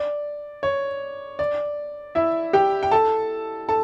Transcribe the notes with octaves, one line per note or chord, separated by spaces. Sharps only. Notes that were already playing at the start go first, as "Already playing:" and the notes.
Already playing: D5
C#5
D5
E4 E5
G4 G5
G5
A4 A5
A4 A5